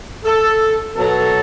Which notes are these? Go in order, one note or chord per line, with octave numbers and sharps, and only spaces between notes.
A4
B2 F#3 A4